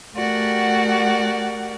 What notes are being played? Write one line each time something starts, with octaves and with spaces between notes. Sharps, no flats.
A3 F#4 G4 A#4 D5 F#5